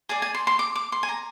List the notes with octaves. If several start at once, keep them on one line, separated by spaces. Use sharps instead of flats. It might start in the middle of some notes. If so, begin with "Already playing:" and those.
G#4 D5 G#5
G#5
C6
C6
D6
D6
C6
G#5
A#5